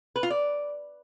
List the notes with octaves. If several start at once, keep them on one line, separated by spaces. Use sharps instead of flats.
B4
F4
D5